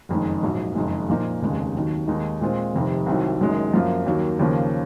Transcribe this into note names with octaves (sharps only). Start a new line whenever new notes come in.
F#1 F2 D#3 G#3
A#1 G#2 F#3
F#1 F2 D#3 G#3
A#2 F3 A#3 D#4
F1 D#2 C#3 G#3
D#2 D#3 F#3
D#2 D#3 G#3 D#4
A#2 G#3 C4 F4
F1 F2 C3 D#3
C2 C3 D#3 F#3
F#1 F#2 D#3 G#3
F#2 F3 A#3 F4
D#2 D#3 F#3 A#3
D#2 C#3 F3 A#3 C#4